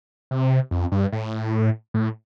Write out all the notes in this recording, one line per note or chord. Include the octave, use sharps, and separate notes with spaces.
C3
F2
G2
A2
A2